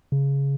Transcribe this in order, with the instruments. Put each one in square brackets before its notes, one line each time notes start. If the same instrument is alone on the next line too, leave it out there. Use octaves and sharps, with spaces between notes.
[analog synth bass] C#3